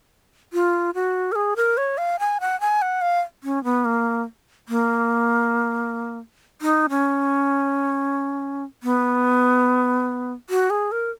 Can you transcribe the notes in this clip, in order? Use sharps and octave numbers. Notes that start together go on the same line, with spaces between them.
F4
F#4
A#4
G#4
A#4
C#5
F5
G#5
F#5
G#5
F#5
F5
C#4
B3
A#3
A#3
D#4
C#4
B3
F#4
G#4
A#4